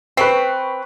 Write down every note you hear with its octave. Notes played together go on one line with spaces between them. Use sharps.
C4 B4 C#6 C7